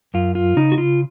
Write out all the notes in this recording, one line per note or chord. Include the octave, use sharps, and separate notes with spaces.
F#2 F4
F4
C#3 D#4
F#4
F4